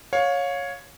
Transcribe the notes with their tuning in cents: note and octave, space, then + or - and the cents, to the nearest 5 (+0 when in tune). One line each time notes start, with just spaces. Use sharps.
C#5 +0 F5 +25